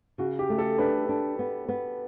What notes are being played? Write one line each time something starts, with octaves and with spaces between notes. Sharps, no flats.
C#3 F#4
G4
A3
A4
D4 B4
D4
B3
B3